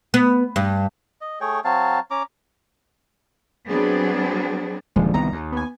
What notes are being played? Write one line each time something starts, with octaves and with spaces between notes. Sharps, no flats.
B3
G2
D#5
A3 G#4 C#5 G5
F#3 C4 F5 A5
C#4 A#5 D6
F#3 G3 B3 C4 D4 G#4
D#1 D3 F3 G#3
C2 D#3 B3 A#5
D#2
B3 G#5